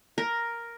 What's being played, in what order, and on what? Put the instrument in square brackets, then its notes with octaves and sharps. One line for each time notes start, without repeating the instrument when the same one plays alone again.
[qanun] A#4